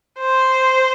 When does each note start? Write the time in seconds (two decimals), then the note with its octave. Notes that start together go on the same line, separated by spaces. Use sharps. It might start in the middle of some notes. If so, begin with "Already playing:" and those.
0.19 C5